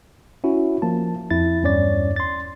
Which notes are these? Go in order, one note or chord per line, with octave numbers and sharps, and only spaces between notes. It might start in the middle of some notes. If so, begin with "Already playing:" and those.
C#4 E4 F#4
F3 A#3 A5
F2 E4 A6
E2 G2 C#4 C#5 D5 A6
C6 A6